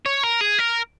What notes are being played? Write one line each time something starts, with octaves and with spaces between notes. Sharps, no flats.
C#5
A#4
G#4
A#4